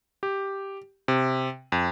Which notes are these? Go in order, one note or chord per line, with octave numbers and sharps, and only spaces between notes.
G4
C3
F2